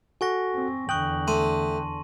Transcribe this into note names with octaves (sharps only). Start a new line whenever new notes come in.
F#4 A4 F#5 G#5 C#6 A#6
C4
E2 D3 G5 C#6 D#6 F#6 F#7
A3 A5 C6 D#7